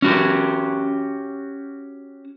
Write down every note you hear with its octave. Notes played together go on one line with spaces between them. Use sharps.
C#4 F#4 G4